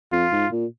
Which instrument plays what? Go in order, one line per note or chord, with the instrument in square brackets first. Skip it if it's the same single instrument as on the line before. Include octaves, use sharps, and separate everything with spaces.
[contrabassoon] F2 [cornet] F4
[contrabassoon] G#2
A#2